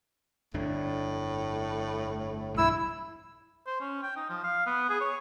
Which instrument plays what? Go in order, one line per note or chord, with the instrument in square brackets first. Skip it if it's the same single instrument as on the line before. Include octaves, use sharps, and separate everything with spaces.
[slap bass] G1 F2 D4 [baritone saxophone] A2
[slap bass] B1 G2 E3 [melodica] E4 E6
[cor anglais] C5
C#4
G5
D#4
F3
F5
B3
G#4
C#5